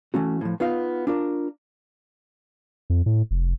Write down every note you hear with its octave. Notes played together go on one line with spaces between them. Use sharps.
E3 A3 C#4 F#4
A2 F3
B3 D#4 F4 F5
D4 F4 A#4
F2
A2
F1